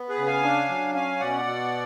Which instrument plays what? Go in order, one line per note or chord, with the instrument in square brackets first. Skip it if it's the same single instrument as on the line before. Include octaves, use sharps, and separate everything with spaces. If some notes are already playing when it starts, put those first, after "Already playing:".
Already playing: [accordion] B3
G#4 B4
C#3
F5 G#5
D4
F#3
C#4 F5 G#5
B2 D5 F#5
B2